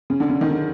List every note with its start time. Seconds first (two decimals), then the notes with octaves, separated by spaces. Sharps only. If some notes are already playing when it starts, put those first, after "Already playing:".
0.10 C#3
0.20 D3
0.30 C#3
0.41 D#3
0.51 D3